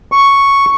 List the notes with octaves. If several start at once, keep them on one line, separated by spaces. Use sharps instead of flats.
C#6